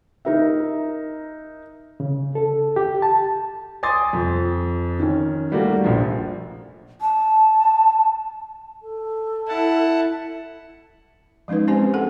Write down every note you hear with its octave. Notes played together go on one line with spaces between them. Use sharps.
D#4 A#4 E5
C#3
A4
G4
A5
G#5 C6 D6 D#6 A6
F2
D#3 C#4
G3 A3 A#3 F#4
A#1 F3
A5
A4
E4 F#5 A5
F3 G#3 C#4 D#4 B4
G#3 C4 C#4 G4 C5 G#5
G#4 A4 F#5